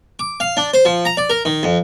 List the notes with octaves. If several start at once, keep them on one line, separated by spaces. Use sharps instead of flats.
D6
F5
D4
C5
F3
A#5
D5
A#4
D#3
F2